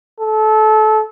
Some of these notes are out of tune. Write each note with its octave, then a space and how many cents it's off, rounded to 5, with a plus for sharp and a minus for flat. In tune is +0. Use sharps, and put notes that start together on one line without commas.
A4 -25